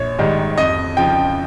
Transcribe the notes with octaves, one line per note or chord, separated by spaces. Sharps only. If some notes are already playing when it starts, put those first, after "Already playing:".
Already playing: A#1 C#5
G#2 D#3 G3
F2 D#5
C#3 F3 G5